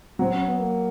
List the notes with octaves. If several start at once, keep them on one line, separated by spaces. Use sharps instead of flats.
F#3 C4
C#4
B3
A#3